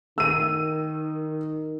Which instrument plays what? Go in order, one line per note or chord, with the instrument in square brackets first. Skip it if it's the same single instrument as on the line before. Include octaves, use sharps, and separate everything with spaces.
[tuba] D#3 [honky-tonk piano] E6 D#7